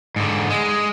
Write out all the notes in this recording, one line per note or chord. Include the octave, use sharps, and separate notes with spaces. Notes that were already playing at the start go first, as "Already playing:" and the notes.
G#2 D3
G#3